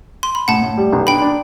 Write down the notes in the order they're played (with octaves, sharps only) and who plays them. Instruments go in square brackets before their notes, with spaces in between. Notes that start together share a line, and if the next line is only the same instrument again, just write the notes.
[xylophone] C6
B5
[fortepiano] A2 [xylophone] F#5 A5
[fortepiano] A2
G3
B1
[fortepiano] D4 [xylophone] G5 B5
[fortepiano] D4